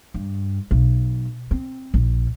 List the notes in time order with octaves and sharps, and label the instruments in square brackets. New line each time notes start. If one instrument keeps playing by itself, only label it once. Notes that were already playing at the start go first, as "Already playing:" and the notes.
[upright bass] G2
B1
C4
A#1